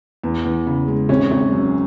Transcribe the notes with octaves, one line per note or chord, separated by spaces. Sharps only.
E2
E2
C#3
G#3
G#1 C#4
G#1
F#2